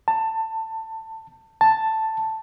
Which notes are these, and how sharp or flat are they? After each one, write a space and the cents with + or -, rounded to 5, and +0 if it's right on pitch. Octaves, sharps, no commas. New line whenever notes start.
A5 +20
A5 +5